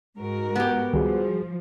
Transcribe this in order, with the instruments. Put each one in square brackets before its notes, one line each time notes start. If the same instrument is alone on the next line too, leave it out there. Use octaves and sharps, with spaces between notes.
[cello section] G#2 F#4 A#4
[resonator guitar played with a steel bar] B3 G4
[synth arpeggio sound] C#2 D#3 [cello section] F3 [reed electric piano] G3 F#4 G#4